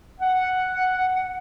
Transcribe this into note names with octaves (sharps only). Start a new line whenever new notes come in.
F#5